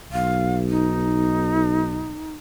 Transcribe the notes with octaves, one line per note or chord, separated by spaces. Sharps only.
B1 F5
D#4